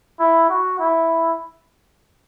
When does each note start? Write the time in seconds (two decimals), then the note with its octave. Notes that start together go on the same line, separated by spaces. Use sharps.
0.19 E4
0.49 F#4
0.79 E4